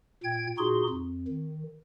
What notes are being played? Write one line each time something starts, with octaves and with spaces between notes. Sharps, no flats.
A#2 G5 G#6
A#2 D#4 F#4 G#4 C6
F2
D#3